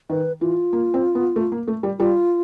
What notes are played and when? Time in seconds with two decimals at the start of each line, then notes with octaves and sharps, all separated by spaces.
0.10 D#3 B4
0.41 E3 F4
0.73 A#3
0.94 C4
1.15 B3
1.36 A3
1.52 A#3
1.67 A3
1.83 G3
1.99 G3 F4